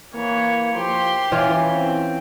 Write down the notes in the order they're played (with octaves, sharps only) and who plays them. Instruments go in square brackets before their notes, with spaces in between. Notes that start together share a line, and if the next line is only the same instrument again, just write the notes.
[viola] E3 C#5 [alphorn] A#3
[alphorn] F3 [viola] G4 C6
[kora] E3 C#4 F4 [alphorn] E4
[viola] C4